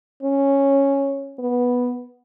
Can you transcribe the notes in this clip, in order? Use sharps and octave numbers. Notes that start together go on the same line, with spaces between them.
C#4
B3